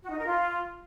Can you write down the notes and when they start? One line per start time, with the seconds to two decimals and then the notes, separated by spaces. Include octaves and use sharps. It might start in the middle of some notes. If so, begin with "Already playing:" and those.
0.02 F#4
0.10 D#4
0.18 A#4
0.26 F4